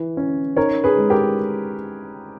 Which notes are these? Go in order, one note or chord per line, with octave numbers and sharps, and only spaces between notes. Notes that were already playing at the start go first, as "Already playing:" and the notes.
Already playing: E3
C#4
D#4 A#4 C#5
G#4 B4
G#3
G4 A#4